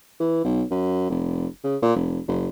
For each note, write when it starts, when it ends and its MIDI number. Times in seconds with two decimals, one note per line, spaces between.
0.20 0.42 52
0.44 0.63 35
0.71 1.05 42
1.10 1.47 29
1.64 1.77 49
1.82 1.94 46
1.96 2.19 29
2.28 2.49 30